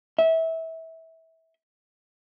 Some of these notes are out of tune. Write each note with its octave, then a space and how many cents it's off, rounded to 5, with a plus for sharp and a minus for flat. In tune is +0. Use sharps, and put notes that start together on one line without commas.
E5 -20